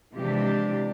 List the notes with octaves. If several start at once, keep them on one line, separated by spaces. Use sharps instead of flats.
C3 E3 F3 G#3 D4 G4